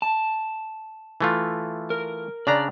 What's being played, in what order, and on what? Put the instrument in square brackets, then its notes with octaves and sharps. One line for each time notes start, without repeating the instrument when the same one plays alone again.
[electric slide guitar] A5
[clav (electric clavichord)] E3 A3 F4
[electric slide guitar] A#4
[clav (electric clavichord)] C#3 D4 A#5 [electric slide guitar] D5